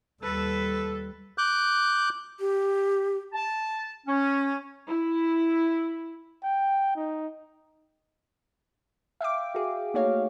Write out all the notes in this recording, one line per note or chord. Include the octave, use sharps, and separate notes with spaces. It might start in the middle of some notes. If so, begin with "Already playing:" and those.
D#2 G3 A4 B4
D6 F#6 G6
G4
A5
C#4
E4
G5
D#4
E5 F5 G5 D6
F#4 G#4
A3 A#3 D#4 F#4 C#5 F5